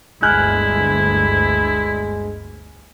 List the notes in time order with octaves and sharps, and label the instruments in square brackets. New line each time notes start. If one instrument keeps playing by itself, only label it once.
[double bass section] G1 D2 G2 [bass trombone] G#3 [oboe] E4 [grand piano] G#5 F6 F#6